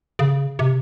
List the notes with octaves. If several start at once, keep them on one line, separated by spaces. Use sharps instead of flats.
C#3
C3